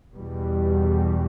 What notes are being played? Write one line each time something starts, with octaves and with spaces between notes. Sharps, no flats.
E2 B2 G3